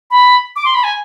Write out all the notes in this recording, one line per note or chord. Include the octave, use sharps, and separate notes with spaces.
B5
D6
C6
B5
G#5